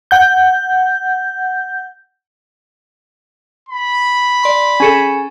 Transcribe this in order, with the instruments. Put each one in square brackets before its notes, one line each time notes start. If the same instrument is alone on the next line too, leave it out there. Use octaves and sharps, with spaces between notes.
[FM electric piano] F#5 G6
[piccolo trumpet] B5
[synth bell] D5 C6
[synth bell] C#4 G#4 A4 [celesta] G#5 C#7